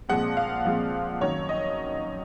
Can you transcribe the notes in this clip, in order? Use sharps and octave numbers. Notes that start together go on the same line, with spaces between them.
A#2 F3 G#3 C4 F#5
F5
A#2 F3 G#3 C4
F#2 D#3 F#3 C#5
D#5